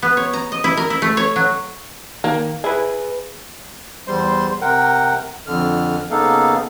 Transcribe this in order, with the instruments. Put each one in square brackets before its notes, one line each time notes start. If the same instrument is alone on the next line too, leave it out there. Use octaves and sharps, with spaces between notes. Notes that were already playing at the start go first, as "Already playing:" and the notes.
[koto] B3
C#5
A#5
D#5
E4
A#4
E4
A3
C#5
F#3
[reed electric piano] D#3 [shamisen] A#3
[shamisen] E4 [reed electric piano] G#4 B4
[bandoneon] E2 G3 C5 C6
C3 A#4 F#5 G5
F2 D3 F6
C#3 A#3 B3 D#4 A4 F5